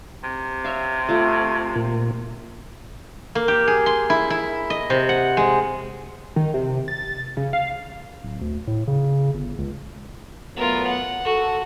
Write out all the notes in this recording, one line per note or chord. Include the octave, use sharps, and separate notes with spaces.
C3
C#5 E5 F5
A3 F4
A#2
A#3
G4
G#4
C6
E4
E4
D#5
C3
F#5
G#3
D#3
C3
A6
C#3
F5
D1
D2
A2
C#3
G1
C#2
F#3 A3 B3 F4 A#4
F#5
F#4 A4